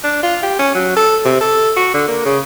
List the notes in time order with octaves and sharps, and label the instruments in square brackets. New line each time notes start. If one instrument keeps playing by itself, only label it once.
[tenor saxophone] D4
F4
G4
C#4
F#3
A4
C3
A4
F#4
D3
A#3
C#3